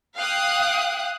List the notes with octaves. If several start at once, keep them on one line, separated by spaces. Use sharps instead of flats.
F5 G5 D#6 F#6